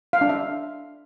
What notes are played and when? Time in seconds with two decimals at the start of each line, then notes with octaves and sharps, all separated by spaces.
0.13 F5
0.21 D4
0.29 E5